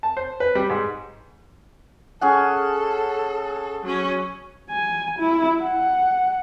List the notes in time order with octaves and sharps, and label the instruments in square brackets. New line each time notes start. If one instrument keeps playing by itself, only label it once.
[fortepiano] A5
C5
B4
G3
G#2
[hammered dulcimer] C#4 G#4 F#5 [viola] A4
[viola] F#3 C#4
[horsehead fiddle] G#5
E4
F#5